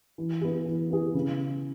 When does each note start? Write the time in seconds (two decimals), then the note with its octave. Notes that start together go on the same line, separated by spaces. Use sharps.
0.18 E3
0.41 B3 E4 G#4
0.66 E3
0.90 B3 E4 G#4
1.14 C#3